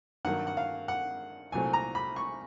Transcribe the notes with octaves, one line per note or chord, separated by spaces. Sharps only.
G2 D#3 F#3 A#3 F#5
F#5
F5
F#5
C2 A#2 F#3 A3 C4 G#5
A#5
B5
C#6